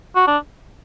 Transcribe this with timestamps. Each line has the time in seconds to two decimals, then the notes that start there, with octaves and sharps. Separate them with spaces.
0.15 F#4
0.27 D4